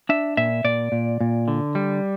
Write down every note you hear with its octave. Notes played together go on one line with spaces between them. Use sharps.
D4 E5
A#2 E5
A#2 D5
A#2
A#2
D3
G3